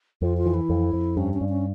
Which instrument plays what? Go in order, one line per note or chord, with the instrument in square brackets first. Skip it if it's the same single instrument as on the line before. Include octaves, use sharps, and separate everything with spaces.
[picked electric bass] F2 [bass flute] F4
[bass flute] F4
[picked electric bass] E3
[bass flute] E4
[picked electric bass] F2
F2
[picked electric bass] G2 [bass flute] C#4
[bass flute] C#4
[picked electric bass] G2
[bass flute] C#4